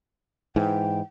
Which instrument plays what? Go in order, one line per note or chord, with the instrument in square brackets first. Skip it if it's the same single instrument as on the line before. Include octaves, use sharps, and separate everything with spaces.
[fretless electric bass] G#2 E3 [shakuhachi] G5